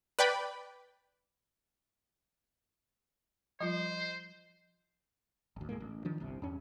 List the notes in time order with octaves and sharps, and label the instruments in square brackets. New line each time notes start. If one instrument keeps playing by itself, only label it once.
[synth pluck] B4 D5 G5 B5
[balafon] F3 G3 F4 [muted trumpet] C5 [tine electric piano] D#5
[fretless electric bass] G#1 D2
D1 A2 G#3 A#3
A1
D#3 F3 D4
G1 C2 C3
E2 G2 C#4